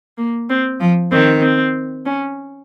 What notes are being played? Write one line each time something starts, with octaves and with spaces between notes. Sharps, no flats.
A#3
C4
F3
D#3 C4
C4
C#4